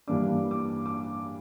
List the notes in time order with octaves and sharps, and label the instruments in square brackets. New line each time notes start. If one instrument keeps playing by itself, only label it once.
[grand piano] G2 E3 A#3 D4 D6
D6
D6